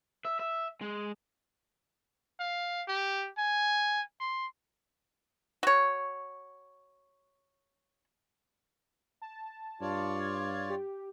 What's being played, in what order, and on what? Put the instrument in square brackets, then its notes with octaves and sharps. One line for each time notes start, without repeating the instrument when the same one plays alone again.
[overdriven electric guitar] E5
E5
G#3
[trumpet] F5
G4
G#5
C6
[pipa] F#4 C#5
[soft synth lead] A5
[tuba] G2 [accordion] F4 C#5 D5
[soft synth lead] G#6
G4